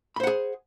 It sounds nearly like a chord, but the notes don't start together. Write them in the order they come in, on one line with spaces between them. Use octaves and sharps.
B5 C5 F#5 G#4